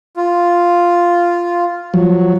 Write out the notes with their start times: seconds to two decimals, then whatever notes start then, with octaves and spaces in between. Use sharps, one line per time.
0.17 F4
1.94 F3 F#3